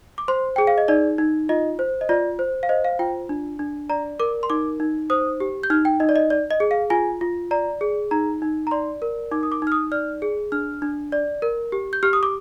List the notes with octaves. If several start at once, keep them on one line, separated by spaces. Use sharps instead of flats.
D6
C5 C6
G#4 G5
F5
D#5
D#4 D5
D#4
F4 D#5
C5
D#5
F4 D5
C5
F5
C5 D#5
F5
F4 G5
D4
D4
D5 A#5
A#4 D6
C6
D#4 D6
D#4
C5 D#6
G4
G6
D#4 F6
G5
D#4 D#5
D5
D#5
D5
D#5
G#4
F5
F4 G#5
F4
D5 A#5
G#4
D#4 A#5
D#4
A#5
D5 C6
A#4
D#4 D6
D#6
D6
D#4 F6
D#6
D5 F6
G#4
D4 F6
D4
D5
A#4
G4
G6
G4 F6
D#6
D6